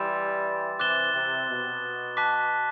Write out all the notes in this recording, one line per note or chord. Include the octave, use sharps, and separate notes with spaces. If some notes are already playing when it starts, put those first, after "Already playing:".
Already playing: E3 G3 C6 E6 A6 E7
C3 E3 D6 F#6 A6 E7 G7
C3
B2
A5 D6 F#6 B6